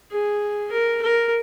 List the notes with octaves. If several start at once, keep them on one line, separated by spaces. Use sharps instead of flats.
G#4
A#4
A#4